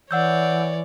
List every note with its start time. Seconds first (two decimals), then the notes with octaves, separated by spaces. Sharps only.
0.11 E3 C#5 D5 F#5 E6 G6